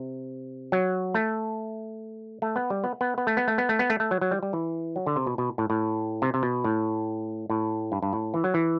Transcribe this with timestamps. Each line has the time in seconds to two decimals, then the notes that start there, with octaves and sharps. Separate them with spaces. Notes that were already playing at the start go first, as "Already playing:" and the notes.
Already playing: C3
0.72 F#3
1.14 A3
2.42 A3
2.56 B3
2.70 G3
2.84 B3
3.01 B3
3.18 B3
3.27 A3
3.37 B3
3.48 A3
3.58 B3
3.69 A3
3.79 B3
3.90 A3
4.00 A3
4.11 F#3
4.21 F#3
4.31 G3
4.43 G3
4.53 E3
4.96 F#3
5.06 D3
5.16 C3
5.26 B2
5.38 B2
5.58 A2
5.70 A2
6.22 C3
6.34 C3
6.43 B2
6.64 A2
7.50 A2
7.92 G2
8.02 G2
8.13 A2
8.34 E3
8.44 F#3
8.54 E3